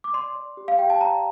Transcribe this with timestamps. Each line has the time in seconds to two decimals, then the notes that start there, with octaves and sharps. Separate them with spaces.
0.04 D6
0.13 D5 C6
0.35 D5
0.57 G4
0.68 F5
0.79 G4 G5
0.90 A5
1.01 D5 A#5